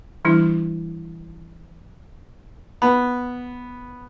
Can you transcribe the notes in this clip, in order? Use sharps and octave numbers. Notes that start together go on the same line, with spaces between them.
E3 G3 D4 E4
B3